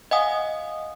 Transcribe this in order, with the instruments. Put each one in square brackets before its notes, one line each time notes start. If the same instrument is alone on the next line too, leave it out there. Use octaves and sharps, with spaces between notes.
[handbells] D#5 F5 F#5 G#5 D#6